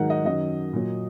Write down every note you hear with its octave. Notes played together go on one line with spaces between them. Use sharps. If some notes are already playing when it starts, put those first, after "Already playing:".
Already playing: G#2 D#3 F#3 A#4 F#5
D#5
F#2 D#3 F#3 D#5
A#2 F#3